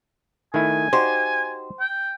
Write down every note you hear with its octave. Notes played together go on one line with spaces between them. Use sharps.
D#3 A3 E4 G#5
D#4 F#4 G4 C5
G5